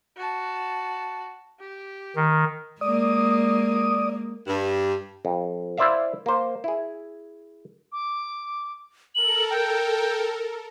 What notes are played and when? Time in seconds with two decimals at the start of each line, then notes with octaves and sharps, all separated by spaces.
0.17 F#4 A5
1.60 G4
2.16 D#3
2.81 G#3 A#3 D5 D#6
4.47 G2
5.25 F2
5.78 E4 C5 D5 E5 F5
6.26 A#3 C5
6.64 E4 G#4
7.92 D6
9.15 A4 A#4 F#7
9.50 G5